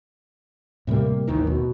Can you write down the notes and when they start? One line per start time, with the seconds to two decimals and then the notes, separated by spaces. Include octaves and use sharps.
0.87 A2 C3 G3 A#3
1.27 A1 D#2 D#3 E3
1.47 B2